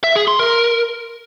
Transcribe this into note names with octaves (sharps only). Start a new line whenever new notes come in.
E5
G#4
C6
A#4